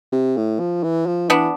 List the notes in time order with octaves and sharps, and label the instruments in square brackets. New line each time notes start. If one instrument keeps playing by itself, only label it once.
[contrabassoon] C3
A2
F3
E3
F3
[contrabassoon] E3 [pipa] B3 D4